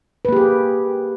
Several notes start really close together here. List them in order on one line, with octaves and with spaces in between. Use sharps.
B4 A#3 G4 G#4